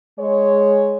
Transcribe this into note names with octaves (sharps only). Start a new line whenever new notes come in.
G#3 C#5